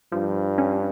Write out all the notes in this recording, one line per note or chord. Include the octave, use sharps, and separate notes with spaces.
G2 F3
C#4